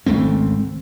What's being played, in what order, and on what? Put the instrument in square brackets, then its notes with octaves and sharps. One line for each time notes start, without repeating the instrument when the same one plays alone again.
[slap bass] G#1 C#2 A3 C4